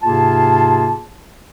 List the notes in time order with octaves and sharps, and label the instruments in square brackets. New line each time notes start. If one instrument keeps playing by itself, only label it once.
[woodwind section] G#2 C3 A#3 F4 G#4 A5